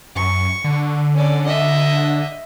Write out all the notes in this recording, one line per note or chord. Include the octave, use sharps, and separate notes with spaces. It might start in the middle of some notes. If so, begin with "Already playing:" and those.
F#2 C#6
D3
C#4 D5
D#5 E5